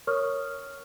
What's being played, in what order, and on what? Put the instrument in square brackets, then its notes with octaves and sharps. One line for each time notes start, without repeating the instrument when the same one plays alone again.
[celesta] A#4 C#5 C#6 D#6 F6